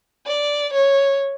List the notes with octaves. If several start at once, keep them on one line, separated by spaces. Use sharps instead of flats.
D5
C#5